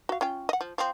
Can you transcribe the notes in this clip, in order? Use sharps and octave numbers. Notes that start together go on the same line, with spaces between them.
F#4 F5
C#4 F4 G5
D#5 F#5
F3
F3 C4